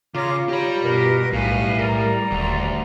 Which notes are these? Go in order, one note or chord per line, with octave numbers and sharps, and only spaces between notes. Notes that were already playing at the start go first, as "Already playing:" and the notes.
C#3 F4 C#5 A#5 D6
G4 C#5 A#5 B5
G2 B2 A#4 B4
B1 A2 G3 B4 F5 G#5
A#4 D5 A#5
D#1 D2